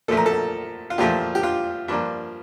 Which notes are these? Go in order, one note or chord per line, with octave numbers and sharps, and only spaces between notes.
A#2 F3 A3 A4
A#4
A4
F4
A#2 F3 A3 G4
G4
F4
G2 F3 A#3 D4